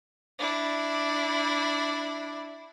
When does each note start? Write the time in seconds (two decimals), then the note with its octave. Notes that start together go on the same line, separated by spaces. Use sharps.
0.39 D4 E4